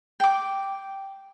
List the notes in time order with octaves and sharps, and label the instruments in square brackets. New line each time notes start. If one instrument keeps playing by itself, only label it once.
[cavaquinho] G5 D6